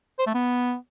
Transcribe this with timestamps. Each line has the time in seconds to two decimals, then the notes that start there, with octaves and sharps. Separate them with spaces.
0.19 C5
0.27 A3
0.34 B3